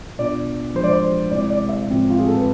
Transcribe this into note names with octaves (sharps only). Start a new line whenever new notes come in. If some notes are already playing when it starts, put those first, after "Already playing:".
B2 B3 D4 F4 D5
F3 G#3 D4 F4 C5
D5
C5
C3 G#3 C4 E4 D5
D5
E5
A2 F3 G#3 C4 F4
F4
G#4
A4
B4